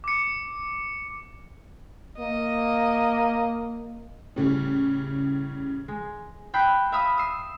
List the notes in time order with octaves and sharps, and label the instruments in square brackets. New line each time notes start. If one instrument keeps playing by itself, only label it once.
[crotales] D6 C#7
[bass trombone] A#3 [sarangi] D#5
[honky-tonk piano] A2 C#3 G3
[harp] G#3
G5 B5 E6 F#6 B6 C7
E5 F5 B5 D#6 E6
D#6 E6 C7